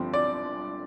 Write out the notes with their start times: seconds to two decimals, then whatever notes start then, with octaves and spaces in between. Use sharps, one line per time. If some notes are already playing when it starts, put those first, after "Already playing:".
Already playing: G1 G2 D3 F3 C4
0.14 D5